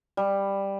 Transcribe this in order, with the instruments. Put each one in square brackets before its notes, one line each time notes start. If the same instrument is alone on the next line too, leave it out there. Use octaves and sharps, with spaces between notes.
[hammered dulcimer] G3